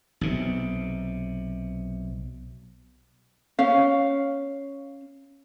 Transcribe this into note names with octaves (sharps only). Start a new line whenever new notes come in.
B1 C3
C#4 F5